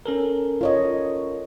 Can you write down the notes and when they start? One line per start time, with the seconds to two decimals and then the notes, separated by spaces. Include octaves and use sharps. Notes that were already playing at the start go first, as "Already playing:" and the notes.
0.06 C#4 A4 A#4
0.61 F4 C#5 D#5